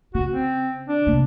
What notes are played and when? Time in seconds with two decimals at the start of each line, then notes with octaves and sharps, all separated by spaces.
0.15 C#3 F#4
0.32 C4
0.88 D4
1.06 C3 A#3